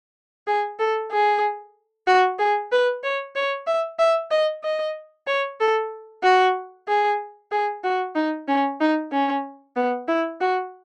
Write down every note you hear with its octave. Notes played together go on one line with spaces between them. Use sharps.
G#4
A4
G#4
F#4
G#4
B4
C#5
C#5
E5
E5
D#5
D#5
C#5
A4
F#4
G#4
G#4
F#4
D#4
C#4
D#4
C#4
B3
E4
F#4